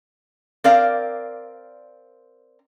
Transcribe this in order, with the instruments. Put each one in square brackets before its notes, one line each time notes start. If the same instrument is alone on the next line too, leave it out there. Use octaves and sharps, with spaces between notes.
[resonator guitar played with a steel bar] C4 A#4 D5 F5